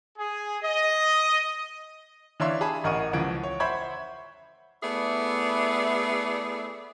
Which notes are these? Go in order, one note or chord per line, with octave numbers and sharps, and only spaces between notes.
G#4
D#5
E3 D4 C#5 E5 F5 C6
G#4 A5 B5
A1 A#4 D#5 F#5 C#6 D#7
C#2 E3 F3 F#5 G#6 D7
C#5
C5 E5 F#5 B5 C#6 G#6
A3 B3 E4 G#4 D5 E5